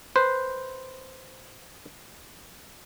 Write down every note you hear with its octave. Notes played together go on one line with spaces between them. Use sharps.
B4 C5